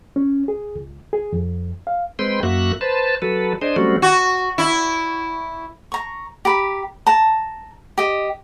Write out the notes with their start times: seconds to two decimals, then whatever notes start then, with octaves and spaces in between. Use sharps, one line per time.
0.16 C#4
0.48 G#4
0.76 C#2
1.13 G#4
1.33 F2
1.87 F5
2.19 G#3 C4 B4 G5 C6
2.43 F#2 A#3 F#4 E5 F#6
2.81 B4 C5 A5
3.22 F#3 A4 B4
3.62 D4 G#4 C5 D#5
3.76 F#3 G3 A3 C4 C#4 F#4
4.02 F#4
4.58 E4
5.92 A#5 C#6
6.45 G4 A#5 B5
7.07 A5 A#5
7.98 G4 D#5